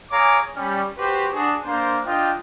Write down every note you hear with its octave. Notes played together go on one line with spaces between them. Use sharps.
G#4 C#5 F5 G#5 A#5 D6
G3 C#4
F#4 G4 B4 C5
D4 F#4 G#4
A#3 D4 C5
D4 F4 D#5 G5